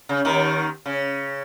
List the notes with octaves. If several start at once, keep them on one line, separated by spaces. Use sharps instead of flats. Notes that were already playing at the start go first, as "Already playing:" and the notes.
C#3
D#2 D#3
C#3